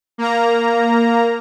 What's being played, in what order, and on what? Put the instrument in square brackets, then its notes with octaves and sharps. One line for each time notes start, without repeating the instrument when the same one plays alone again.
[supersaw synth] A#3 A#5